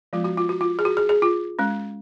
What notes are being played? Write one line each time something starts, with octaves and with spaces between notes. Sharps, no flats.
F3 G#3 B3 F4
F#4
F4
F#4
F4
G#4
F#4
G#4
G#4
F4
G#3 C#4